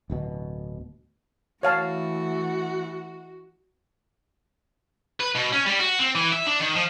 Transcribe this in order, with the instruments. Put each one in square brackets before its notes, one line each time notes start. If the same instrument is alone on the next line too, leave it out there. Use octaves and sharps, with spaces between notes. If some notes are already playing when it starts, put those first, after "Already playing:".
[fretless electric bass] D1 D2 B2
[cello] E3 A3 [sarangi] F#4 [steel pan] C#5 F5 A5
[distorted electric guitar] B4
B2
C#4
G3
F#4
C4
E3
E5
D4
D#3
F3